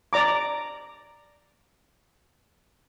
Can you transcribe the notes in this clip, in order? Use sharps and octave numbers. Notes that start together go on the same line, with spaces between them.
D5 A#5 D6